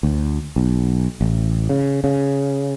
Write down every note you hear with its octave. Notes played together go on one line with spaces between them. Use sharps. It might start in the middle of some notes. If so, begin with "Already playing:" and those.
D2
B1
A1
C#3
C#3